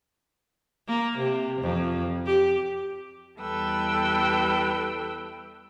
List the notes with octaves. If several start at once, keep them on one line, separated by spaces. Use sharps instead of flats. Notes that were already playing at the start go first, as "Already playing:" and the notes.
A#3
C3
F2
G4
E2 G3 A4 B4 G5 E6